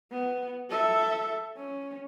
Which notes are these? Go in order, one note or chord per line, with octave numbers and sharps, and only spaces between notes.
B3
A4 E5
C#4